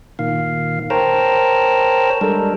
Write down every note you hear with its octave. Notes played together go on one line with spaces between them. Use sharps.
A#2 D#3 F5
A#4 C5 C#5 G5 A5 A#5
G3 G#3 D4 A4 A#4